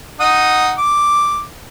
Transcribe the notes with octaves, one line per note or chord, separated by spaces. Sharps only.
D#4 F#5 D#6
D6